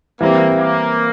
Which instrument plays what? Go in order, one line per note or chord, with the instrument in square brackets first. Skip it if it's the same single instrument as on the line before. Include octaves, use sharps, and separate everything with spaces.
[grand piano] E3 G3 C4 [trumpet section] A#3
[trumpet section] A#3